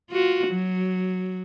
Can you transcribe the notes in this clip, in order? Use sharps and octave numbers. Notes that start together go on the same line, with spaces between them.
F4 F#4
F#3